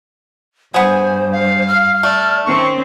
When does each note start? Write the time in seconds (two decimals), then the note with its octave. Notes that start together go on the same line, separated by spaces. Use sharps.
0.74 G2 B3 G#4 C5 G#5
1.33 F5
1.68 F6
2.03 A3 D5
2.45 D#3 C4 C#4 C#6